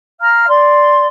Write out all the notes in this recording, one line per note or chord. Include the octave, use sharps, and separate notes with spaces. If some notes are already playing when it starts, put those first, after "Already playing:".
F5 A#5 F6
D5 C6